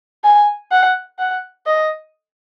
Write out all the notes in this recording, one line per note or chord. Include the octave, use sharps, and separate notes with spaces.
G#5
F#5
F#5
D#5